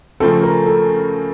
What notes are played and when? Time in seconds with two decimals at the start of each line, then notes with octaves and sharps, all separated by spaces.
0.20 C#3 F3 A3 C4 A4
0.43 A#4
0.67 A4